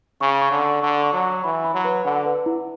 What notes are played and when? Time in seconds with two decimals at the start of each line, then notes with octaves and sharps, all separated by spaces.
0.21 C#3 C#6
0.41 C#6
0.51 D3
0.62 C#6
0.82 D3 C#6
1.04 C#6
1.13 F#3
1.23 C#6
1.44 E3 B5
1.64 B5
1.74 F#3
1.85 B4
2.05 D3 F#5
2.26 B4
2.46 E4